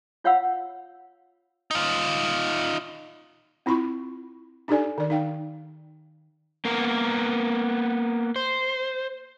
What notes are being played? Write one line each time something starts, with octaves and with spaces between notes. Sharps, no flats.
F4 C#5 F5 F#5 B5 E6
D#4 F4
C4 E4 F4 B5 C#6
D4 D#4 G4 A4 D5 G#5
D#3 D5
D#4 F5 G5
A#3 B3 A#4
C5